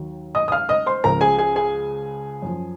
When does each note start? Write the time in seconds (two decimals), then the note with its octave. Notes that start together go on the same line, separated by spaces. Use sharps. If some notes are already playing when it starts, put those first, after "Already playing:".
Already playing: D#2 D#3 F#3
0.35 D#5 D#6
0.48 D#6
0.52 F5 F6
0.69 D#5 D#6
0.86 C5 C6
1.04 C#2 C#3 F3 A#4 A#5
1.21 G#4 G#5
1.38 G#4 G#5
1.56 G#4 G#5
2.42 F#2 F3